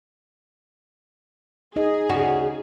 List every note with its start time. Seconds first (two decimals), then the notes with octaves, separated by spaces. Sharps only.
1.76 D#4 G#4 D#5
2.09 D2 C#3 F#4